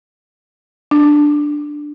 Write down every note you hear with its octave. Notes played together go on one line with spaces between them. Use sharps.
D4